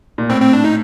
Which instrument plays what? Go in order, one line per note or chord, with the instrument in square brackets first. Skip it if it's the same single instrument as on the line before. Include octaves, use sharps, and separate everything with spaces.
[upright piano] A#2
[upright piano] A2 [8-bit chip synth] C4
[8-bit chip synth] C4
D4
D#4